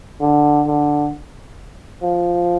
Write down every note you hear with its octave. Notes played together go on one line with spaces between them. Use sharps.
D3
D3
F3